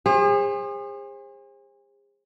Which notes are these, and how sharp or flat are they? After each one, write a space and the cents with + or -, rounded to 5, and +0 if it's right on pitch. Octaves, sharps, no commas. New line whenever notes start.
G#4 -40 C5 +35